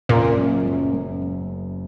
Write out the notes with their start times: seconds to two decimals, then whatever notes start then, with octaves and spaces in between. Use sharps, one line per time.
0.09 F#1 A#2
0.38 F#2
0.66 F#2
0.94 F#2